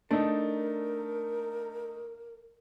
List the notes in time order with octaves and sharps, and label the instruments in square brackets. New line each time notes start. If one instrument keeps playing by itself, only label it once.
[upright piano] A3 D#4 [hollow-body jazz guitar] D4 [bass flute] A#4